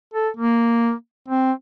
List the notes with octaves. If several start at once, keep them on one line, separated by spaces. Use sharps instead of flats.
A4
A#3
C4